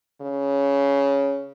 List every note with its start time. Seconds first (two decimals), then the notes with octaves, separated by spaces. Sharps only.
0.21 C#3